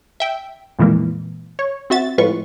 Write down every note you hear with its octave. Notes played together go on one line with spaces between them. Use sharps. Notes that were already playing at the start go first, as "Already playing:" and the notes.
E5 G5
F2 A#2 E3 G#3 A#3
C#5
C4 F#4 E5 A6
A2 F3 G#3 F4 B4 C#6